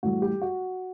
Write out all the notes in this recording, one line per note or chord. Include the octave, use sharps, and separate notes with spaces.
A2 E3 G3 F#4
G4
F#4